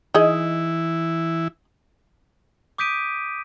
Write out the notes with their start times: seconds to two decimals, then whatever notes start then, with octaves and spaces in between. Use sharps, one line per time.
0.14 E3 D#4 E4 G#4 D#5
2.78 D6 D#6 G6 B6 D7 D#7